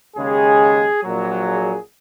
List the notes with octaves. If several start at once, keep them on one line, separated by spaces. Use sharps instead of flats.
D#2 C#3 G#3 G#4
A#1 A#2 F#3
G#4